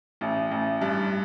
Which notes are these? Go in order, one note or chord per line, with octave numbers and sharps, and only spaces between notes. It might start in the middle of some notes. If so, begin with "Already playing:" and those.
A1
A1
G2